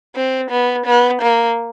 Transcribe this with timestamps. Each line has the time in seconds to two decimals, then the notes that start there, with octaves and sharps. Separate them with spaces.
0.16 C4
0.51 B3
0.86 B3
1.21 A#3